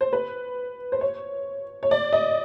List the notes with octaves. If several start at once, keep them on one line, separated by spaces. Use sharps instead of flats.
C5
B4
C5
C#5
C#5
D5
D#5